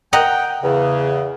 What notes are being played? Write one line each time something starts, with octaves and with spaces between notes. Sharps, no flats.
D#5 F#5 G5 A#5
E2 C#3